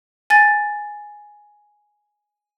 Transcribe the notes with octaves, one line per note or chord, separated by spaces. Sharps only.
G#5 A6